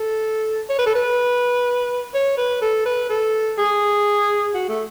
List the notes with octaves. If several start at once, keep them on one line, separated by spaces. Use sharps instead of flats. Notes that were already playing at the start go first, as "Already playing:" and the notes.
Already playing: A4
C#5
B4
A4
B4
C#5
B4
A4
B4
A4
G#4
F#4
A3